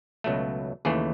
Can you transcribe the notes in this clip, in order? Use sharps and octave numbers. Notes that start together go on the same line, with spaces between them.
C#2 B2 F#3 A3
D#2 C#3 E3 A3 G#4